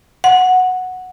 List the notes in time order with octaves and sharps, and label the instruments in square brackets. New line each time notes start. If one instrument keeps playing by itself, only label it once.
[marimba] F#5